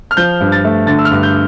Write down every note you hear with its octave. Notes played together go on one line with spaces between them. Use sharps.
F6
F3 G6
G2
A6
A3
D3 A6
E6
F6
G2
G6